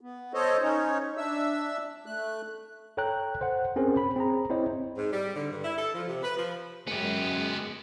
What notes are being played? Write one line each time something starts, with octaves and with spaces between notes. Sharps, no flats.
B3
A4 C5 C#5 D#5
C#4 D#4 C#5
D4 E5 E6
A3 F#6
A4 C#5 G5 A#5 F#6
C5 F#5
C4 C#4 G#4 A#4 C5
B5
C4 G#4 A#5
C4 E4 C5 C#5 D#5
G#2
G3
D3
G2
E4
A4
F3
C3
B4
F3
F#2 G#3 B3 G4